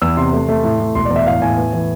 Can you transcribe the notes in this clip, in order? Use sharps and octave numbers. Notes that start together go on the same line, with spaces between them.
E2 E6
C3 C6
A3
A3
A2
A2
E1 C6
D5
E2
E5
A2 F5
A2 G#5
B3
E3